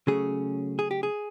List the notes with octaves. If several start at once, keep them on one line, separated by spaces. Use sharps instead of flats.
C#3 F#3 A3 C#4 G#4
G#4
G4
G#4